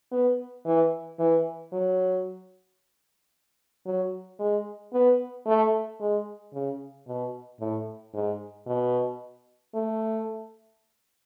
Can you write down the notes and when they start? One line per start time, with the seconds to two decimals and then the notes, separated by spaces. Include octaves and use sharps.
0.12 B3
0.65 E3
1.19 E3
1.72 F#3
3.86 F#3
4.39 G#3
4.93 B3
5.46 A3
6.00 G#3
6.53 C#3
7.07 B2
7.60 A2
8.14 G#2
8.67 B2
9.75 A3